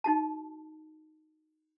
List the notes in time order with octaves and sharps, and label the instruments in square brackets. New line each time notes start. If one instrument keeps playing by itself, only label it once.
[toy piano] D#4 F#4 A5